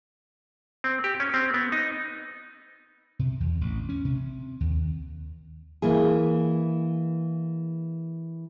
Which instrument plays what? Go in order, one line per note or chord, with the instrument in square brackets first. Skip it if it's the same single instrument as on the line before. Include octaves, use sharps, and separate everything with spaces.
[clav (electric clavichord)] C4
G4
C#4
C4
B3
D#4
[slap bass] C3
E2
A1
C#4
C3
D#2
[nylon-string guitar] E3 A#3 E4 G#4